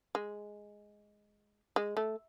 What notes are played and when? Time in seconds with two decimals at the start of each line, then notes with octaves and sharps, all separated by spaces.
0.15 G#3
1.76 G#3
1.97 A3